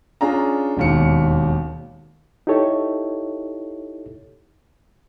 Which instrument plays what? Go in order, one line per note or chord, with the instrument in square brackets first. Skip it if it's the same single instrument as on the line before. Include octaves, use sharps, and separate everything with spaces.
[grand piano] C#4 D4 F4 G#4 A#5
E1 D#2 C#7
[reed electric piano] D#4 E4 G4 A4 C#5